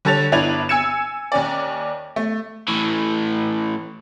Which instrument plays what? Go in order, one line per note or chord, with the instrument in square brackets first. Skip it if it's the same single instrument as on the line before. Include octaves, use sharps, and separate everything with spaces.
[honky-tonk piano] D3 G3 A4 C#5 A6 F7
G1 D4 E4 B4 G#6 F7
G#5 E6 G#6 C#7 E7
D#2 C#4 D5
A3
[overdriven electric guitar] A2 E3